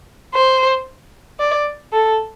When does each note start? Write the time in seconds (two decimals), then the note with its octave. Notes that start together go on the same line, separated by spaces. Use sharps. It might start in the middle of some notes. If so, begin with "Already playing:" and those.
0.34 C5
1.40 D5
1.93 A4